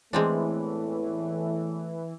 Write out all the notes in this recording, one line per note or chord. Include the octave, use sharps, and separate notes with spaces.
E2 A2 E3 G#3 A3 C4 D4